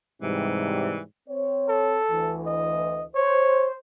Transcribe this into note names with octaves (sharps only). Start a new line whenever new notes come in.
G#2 C3 E3 G3
C4 C#5
A4
D2 E3
D#5
C5 C#5